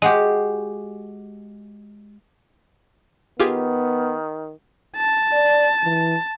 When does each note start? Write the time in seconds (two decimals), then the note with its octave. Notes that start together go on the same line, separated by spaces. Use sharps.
0.02 G#3 F#4 G4
3.40 D#3 B3 F4 G4 G#4
4.97 A5
5.32 D5
5.84 E3